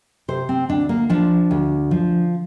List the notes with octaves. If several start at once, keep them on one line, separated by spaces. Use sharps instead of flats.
C3 C5
C4
D2 D4
A#3
F3 D4
D2
F3